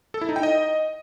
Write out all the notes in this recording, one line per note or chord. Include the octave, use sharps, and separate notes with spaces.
A4
E4
D#4
G5
D#5